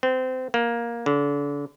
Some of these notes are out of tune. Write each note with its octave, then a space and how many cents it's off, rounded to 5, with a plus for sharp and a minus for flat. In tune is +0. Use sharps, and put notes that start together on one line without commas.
C4 -25
A#3 +10
D3 -35